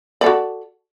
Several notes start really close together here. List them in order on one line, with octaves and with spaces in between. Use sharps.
D5 A4 F#4